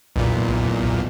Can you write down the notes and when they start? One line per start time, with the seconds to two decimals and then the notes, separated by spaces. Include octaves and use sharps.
0.16 B1 E2 A#2